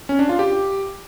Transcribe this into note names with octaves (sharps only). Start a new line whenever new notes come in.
C#4
D4
F4
G4